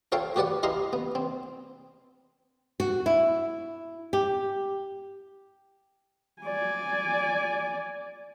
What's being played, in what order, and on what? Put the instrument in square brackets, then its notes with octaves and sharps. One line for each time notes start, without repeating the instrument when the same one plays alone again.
[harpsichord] F4 A4 C5 C#5 F5 G5
F#4 G4 B4 D5 F#5
E4 G4 D#5 F5 A#5 C6
B3
C4
[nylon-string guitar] F#4
E4
G4
[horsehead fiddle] D5 G#5